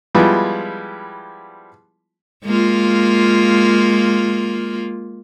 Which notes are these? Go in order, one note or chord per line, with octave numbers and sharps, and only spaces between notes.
F3 G3 G#3 B3 E4 F4
G#3 A#3 F4